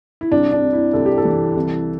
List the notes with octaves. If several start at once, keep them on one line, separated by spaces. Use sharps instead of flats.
E4
C2 D4
D4
C3
E4
C2 A4
G4
A4
E3
C2